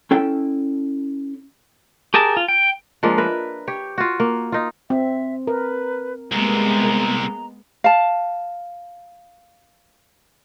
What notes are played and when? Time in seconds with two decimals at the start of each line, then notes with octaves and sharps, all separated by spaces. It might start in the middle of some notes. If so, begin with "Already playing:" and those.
0.11 C#4 E4 A4 G5
2.14 G4 G#4 A#4 A5
2.37 F4
2.48 G5
3.03 F3 G#3 A#3 D4
3.18 A#4 B4 E5
3.67 G4 C#5
3.98 F4 F#4
4.20 A#3
4.52 D#4 F4
4.90 C4 E5
5.47 A#4 B4
6.32 C2 C3 G#3 A#3 B3 A#5
7.84 F5 A5